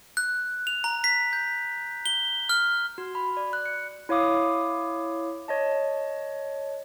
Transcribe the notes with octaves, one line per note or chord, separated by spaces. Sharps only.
F#6
F7
A#5
B6
G6
G7
F6
F#4
B5
D5
F#6
C#7
E4 C#5 F5 D6 D#6
C#5 D#5 A5